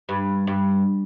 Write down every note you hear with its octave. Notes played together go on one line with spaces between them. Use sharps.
G2
G2